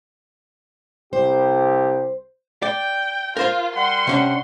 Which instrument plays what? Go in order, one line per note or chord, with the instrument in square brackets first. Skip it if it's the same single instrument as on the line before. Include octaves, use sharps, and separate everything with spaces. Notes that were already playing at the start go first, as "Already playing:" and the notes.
[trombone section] C2 G4 [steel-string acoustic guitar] C5
[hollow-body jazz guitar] D5 [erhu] G5
[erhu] F4 [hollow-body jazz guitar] A#4 C5 F5
[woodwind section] G3 F#5 [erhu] C6
[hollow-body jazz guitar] C3 C#4 D4